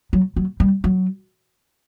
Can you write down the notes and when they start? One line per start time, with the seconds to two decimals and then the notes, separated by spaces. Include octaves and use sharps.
0.13 F#3
0.36 F#3
0.60 G3
0.84 F#3